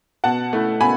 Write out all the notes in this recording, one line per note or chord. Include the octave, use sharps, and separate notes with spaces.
B2 F#5 A5
A3 E4
B2 G#5 B5